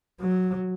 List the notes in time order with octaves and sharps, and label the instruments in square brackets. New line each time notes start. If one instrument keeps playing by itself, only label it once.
[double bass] F#3